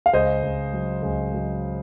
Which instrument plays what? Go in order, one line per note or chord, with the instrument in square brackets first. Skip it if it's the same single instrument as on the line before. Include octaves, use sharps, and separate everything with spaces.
[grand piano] F5
C#2 C5 D#5
C#2
F#3
C#2
F#3